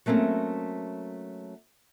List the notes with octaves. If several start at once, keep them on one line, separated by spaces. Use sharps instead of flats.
F#3 A3 A#3 C4 C#4